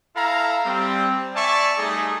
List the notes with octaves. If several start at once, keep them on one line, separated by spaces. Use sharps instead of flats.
E4 A4 F5 A#5
G3 C4
D5 E5 G#5 A5 C#6
G3 A3 D#4 G#4